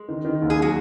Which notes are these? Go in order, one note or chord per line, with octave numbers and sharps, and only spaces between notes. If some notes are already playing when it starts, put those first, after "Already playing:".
Already playing: G#3
D#3
D#3
D#2
G#4
F#3
F#4